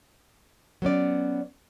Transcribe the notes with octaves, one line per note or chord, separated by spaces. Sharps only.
F#3 B3 C#4 D5